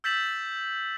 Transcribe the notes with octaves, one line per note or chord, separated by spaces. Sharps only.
E6 G6 A6 B6 E7 F#7